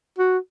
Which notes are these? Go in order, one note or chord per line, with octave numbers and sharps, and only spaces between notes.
F#4